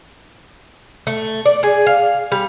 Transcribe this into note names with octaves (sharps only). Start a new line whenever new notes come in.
A3
D5
G#4
F5
G3